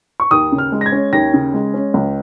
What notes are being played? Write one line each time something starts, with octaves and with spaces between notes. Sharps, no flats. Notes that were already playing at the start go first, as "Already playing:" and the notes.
C#6
D#2 D#6
C#3
F6
G#3
A#6
G#6
C#4
D#2 A#6
C#3
G#3
C#4
C#2